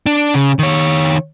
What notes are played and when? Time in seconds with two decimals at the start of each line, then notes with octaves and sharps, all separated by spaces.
0.06 D4
0.34 C#3
0.59 D#3 C#5